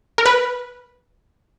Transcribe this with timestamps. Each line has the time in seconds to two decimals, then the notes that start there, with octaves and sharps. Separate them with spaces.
0.18 A#4
0.26 B4